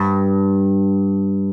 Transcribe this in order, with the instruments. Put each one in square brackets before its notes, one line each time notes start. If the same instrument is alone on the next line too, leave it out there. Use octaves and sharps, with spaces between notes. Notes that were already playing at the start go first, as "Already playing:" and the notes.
Already playing: [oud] G2